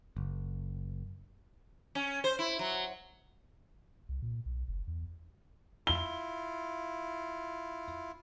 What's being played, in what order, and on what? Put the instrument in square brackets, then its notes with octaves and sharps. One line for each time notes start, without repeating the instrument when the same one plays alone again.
[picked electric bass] F#1
[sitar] C#4
C5
E4
F#3
[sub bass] C2
A#2
B1
F#1
E2
[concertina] E4 F4 [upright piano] G7